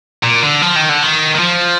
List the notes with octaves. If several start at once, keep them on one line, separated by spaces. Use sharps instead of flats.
A#2
D3
F3
D#3
D3
D#3
D#3
F3